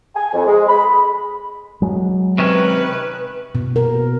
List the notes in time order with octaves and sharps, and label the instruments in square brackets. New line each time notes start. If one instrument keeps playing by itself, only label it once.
[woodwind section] G#5
F2
G#3
B5
[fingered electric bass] F#3 G#3
[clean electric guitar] C3 D#3 C#4 [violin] B4
[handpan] B2
A#4